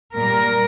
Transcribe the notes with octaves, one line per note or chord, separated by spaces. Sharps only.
A#2 G3 A#4